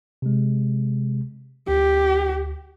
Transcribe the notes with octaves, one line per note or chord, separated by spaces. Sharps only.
C3 G#3
D2 G4